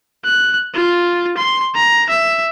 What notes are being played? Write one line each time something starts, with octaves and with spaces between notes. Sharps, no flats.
F#6
F4
C6
A#5
E5